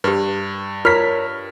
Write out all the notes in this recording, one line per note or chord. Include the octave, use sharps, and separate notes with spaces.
G2 G4 B4
F4 A#4 C#5 A#5 F6 B6